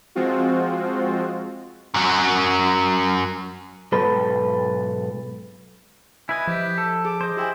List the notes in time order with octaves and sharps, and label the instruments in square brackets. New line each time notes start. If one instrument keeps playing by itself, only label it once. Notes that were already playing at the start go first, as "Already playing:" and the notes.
[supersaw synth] F3 G#3 C4 F4 F#4
[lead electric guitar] F#2 F#3
[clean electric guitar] B1 G#2 A4 B4
[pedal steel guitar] E4 B4 D#5 [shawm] G#5
[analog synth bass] F3 [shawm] G4
[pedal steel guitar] A4
[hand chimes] G#4 [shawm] D6
[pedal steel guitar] C5 D#5
[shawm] E4 [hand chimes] G4 G5 G#5